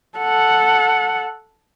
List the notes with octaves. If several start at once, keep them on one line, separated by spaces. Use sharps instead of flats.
A4 F#5